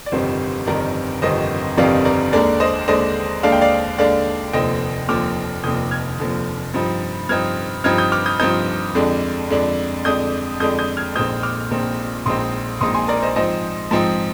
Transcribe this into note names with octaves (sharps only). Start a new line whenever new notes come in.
D5
G1 F2 C3 D#3 G3 C5
G1 F2 C3 D#3 G3 A#4 D5
G1 F2 C3 D#3 G3 C5 D#5
G1 F2 C3 D#3 G3 D5 F5
A#4 D5
D#2 D3 G#3 D4 A#4 D5
C5 D#5
D#2 D3 G#3 D4 C5 D#5
D#2 D3 G#3 D4 F5
G5
D5 F5
D#2 D3 G#3 D4 D5 F5
F1 D#2 D3 F3 C4 D#5 G5
F1 D#2 D3 F3 C4 D6 F6
F1 D#2 D3 F3 C4 D#6 G6
F6 G#6
F1 D#2 D3 F3 C4
G2 F3 C4 D#4
G2 F3 C4 D#4 F6 G#6
G2 F3 C4 D#4 F6 G#6
D#6 G6
D6 F6
D#6 G6
G2 F3 C4 D#4 D#6 G6
F2 D3 G#3 D4
F2 D3 G#3 D4
F2 D3 G#3 D4 D#6 G6
F2 D3 G#3 D4 D#6 G6
D#6 G6
F6 G#6
A#1 A#2 G#3 C4 D#4 D#6 G6
D6 F6
A#1 A#2 G#3 C4 D#4
A#1 A#2 G#3 C4 D#4 C6 D#6
A#1 A#2 G#3 C4 D#4 C6 D#6
G#5 C6
A#4 D5
C5 D#5
G#2 F3 C4 D#4 C5 D#5
G#2 F3 C4 D#4